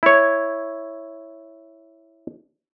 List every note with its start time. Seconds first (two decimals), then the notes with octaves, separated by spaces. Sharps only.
0.03 E4 C#5